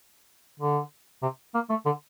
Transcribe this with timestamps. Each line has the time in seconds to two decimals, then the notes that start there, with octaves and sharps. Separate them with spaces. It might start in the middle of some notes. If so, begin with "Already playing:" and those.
0.60 D3
1.22 C3
1.54 A#3
1.70 A3
1.86 D3